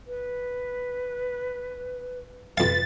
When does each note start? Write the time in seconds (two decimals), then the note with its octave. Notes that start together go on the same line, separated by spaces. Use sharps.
0.07 B4
2.58 F2 B4 F5 A6